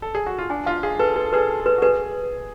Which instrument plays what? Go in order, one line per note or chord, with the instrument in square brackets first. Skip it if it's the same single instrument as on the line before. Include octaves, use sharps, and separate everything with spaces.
[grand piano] A4
G#4
F#4
F4
[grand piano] D4 [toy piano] G#5
[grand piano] F4 [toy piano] F5
[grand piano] G#4 [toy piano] F5
[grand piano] A4 [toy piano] B4
[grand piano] A4 [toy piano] B4
[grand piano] G#4 [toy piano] B4
[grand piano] A4
[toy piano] B4
[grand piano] A4
[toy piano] B4
[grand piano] F#4
[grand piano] G#4 [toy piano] B4